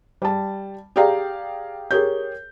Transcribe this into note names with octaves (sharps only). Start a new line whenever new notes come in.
G3 A5
G4 G#4 D5 F5 G5 A#5
G4 G#4 A#4 C#5 G6